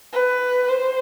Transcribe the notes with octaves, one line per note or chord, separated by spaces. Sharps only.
B4
C5